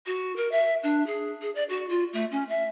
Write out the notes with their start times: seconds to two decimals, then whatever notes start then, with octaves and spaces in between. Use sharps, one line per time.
0.06 F#4
0.36 A#4
0.52 E5
0.83 D4
1.07 G#4
1.42 G#4
1.55 D5
1.69 F#4
1.89 F4
2.13 A3
2.31 C#4
2.49 E5